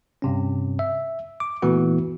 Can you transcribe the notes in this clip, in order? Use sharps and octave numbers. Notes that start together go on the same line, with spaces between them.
G2 C3 C#4
E5
D6
A#2 E3 A3 B3 E4 F#4